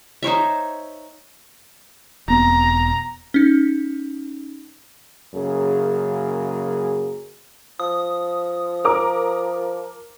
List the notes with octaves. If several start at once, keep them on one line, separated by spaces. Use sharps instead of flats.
D#4 C5 C#5 E5
E1 B3 C4 A#5
C#4 D#4
F#2 C#3 A#3 G#4
F3 D#6
A#4 D6